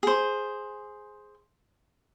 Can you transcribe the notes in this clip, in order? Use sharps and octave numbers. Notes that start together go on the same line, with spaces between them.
G#4 C5